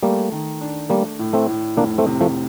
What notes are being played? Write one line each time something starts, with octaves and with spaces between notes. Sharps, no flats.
G3 A3 A#3
D#3
D4
G3 A3 A#3
A2
A3 C4
A2
F1 A#3 D4
A3 C4
C3
F3 A3